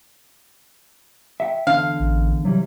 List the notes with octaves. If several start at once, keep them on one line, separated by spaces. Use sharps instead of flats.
E5 F#5 G5
E2 D3 D4 F5
A1
C3 E3 F#3 G3